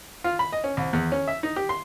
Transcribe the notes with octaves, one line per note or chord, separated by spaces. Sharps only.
F4
B5
D#5
C#4
C2
E2
C#4
E5
D#4
G4
C6